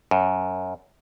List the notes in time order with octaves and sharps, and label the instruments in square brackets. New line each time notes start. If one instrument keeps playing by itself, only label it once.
[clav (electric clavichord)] F#2